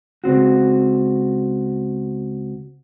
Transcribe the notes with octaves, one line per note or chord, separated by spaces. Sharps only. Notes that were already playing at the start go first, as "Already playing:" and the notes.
C#2 F#2 C4 F#4